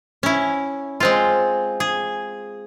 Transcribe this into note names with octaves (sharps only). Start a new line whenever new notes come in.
C#4 E4
G#3 C4 F4
G#4